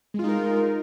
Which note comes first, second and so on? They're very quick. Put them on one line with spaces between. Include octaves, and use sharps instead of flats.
G#3 F4 D#4 A#4